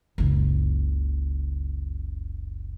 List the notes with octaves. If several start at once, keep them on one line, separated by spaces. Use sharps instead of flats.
F#1 C#2